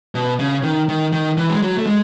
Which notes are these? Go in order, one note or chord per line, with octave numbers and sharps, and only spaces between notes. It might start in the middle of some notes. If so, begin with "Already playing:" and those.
B2
C#3
D#3
D#3
D#3
E3
G#3
F#3
A3
G#3